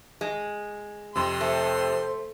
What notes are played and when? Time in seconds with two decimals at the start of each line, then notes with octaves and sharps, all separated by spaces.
0.21 G#3
1.16 F2 C3 C6
1.41 A3 C5